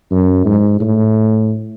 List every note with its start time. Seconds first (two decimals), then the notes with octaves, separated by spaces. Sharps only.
0.11 F#2
0.45 G#2
0.80 A2